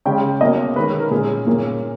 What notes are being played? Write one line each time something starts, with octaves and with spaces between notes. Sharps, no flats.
C#3 G#3 C#4 G5
B2 A#3 C#4 D#5
D#3 G#3 C#4 B4
A#4
A#2 G#3 C#4 G#4
A#2 A#3 C#4